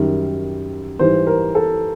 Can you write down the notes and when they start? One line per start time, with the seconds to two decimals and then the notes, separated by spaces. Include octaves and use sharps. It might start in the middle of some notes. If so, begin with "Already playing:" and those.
Already playing: F#2 D#3 G3
0.99 G#2 E3 G3 C5
1.27 A#4
1.55 A4